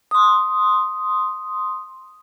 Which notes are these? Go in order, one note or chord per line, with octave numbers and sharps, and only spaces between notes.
C6 D#6